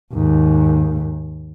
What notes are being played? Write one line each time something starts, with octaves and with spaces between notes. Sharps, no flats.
D#2 G#2